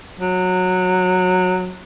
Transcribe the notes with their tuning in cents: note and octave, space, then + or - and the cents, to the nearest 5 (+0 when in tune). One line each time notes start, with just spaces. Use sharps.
F#3 -15